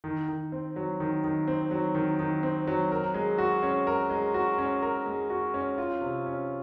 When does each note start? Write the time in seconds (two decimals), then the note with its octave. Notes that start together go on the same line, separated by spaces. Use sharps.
0.04 D#3
0.28 D#3
0.52 C4
0.76 F#3
1.00 D#3
1.24 D#3
1.47 C4
1.71 F#3
1.95 D#3
2.19 D#3
2.43 C4
2.67 F#3
2.92 A#4
3.14 G#3
3.38 F#4
3.63 C#4
3.87 A#4
4.10 G#3
4.34 F#4
4.58 C#4
4.82 A#4
5.06 G#3
5.30 F#4
5.54 C#4
5.78 F4
6.01 C3
6.26 C#4